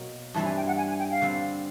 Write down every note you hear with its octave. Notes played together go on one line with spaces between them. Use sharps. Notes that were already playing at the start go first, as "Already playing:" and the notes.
Already playing: B2 F#3 A#3
G2 E3 G3 C4 A5
G#5
G5
F#5
G#5
G#5
G5
F5
D3 G3 C4